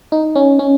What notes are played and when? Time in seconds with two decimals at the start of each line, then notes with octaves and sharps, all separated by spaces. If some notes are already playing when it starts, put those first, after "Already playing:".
0.12 D#4
0.35 C#4
0.59 C#4